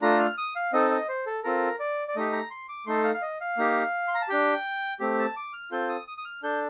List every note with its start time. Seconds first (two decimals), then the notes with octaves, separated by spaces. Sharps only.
0.02 A3 D4 F4 A4 A#5
0.19 F6
0.38 D#6
0.56 F5
0.73 C4 D#4 A4 D#5
0.91 D#5
1.09 C5
1.27 A4
1.44 C4 F4 A4 A#4
1.80 D5
2.08 D5
2.16 A3 D#4 G4 D#5
2.33 A#5
2.51 C6
2.69 D6
2.86 A3 D#4 A4 C6
3.04 F5
3.14 F5
3.22 D#5
3.41 F5
3.58 A#3 D#4 G4
4.08 C6
4.15 A#5
4.21 A5
4.29 D4 G4 G5
5.00 A3 C4 G4
5.19 A5
5.37 D6
5.53 F6
5.71 C4 F4 A4 G6
5.89 D#6
6.08 D#6
6.18 D#6
6.25 F6
6.43 D4 A4 G6